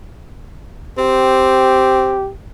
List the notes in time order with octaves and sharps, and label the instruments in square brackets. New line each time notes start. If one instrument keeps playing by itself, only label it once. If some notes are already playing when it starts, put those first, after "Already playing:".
[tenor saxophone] C4 [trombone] G4